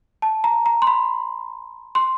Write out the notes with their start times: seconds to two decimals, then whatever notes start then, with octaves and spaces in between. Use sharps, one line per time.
0.22 A5
0.44 A#5
0.66 A#5
0.82 C6
0.87 B5
1.95 C6